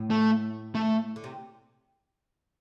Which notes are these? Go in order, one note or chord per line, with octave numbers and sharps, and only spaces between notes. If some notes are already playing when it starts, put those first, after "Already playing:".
Already playing: A2
A3
A3
D3
C3